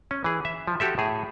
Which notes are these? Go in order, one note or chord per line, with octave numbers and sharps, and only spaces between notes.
C#4
E3 G#4
E5
F3
F#4 G4 A4 E5
A2 G#4